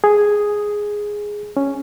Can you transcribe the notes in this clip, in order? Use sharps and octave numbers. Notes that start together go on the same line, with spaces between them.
G#4
C#4